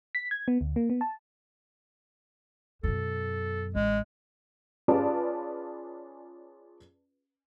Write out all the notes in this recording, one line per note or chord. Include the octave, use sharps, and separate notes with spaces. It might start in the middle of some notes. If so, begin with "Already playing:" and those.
B6
G#6
B3
D2
A#3
B3
A5
F#2 B2 A4
A1 G#3
C#4 F4 G#4 B4 D5 A5